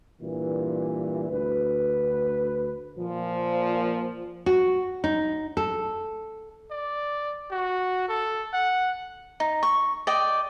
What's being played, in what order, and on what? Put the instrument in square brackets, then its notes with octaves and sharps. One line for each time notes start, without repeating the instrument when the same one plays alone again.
[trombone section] G2 A#2 E3
D2 B4
[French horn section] A#2 F3
[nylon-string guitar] F#4
D#4
A4
[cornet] D5
F#4
A4
F#5
[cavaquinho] D#4
C#6
D5 D#5 G5